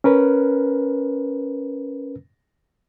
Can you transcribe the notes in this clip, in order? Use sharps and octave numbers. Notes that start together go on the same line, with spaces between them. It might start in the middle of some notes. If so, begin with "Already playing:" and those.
C#4 A#4 B4